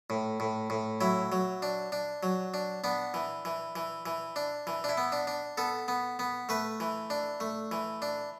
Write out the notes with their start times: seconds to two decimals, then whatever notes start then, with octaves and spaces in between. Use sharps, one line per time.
0.10 A2
0.40 A2
0.70 A2
1.01 F#3 E4
1.32 F#3
1.62 D4
1.92 D4
2.23 F#3
2.54 D4
2.84 B3 D4
3.14 E3
3.45 E3
3.76 E3
4.06 E3
4.36 D4
4.67 E3
4.84 D4
4.89 E4
4.97 B3
5.12 D4
5.27 D4
5.58 B3 A4
5.88 B3
6.19 B3
6.49 A3 B4
6.80 E3
7.10 D4
7.40 A3
7.72 E3
8.02 D4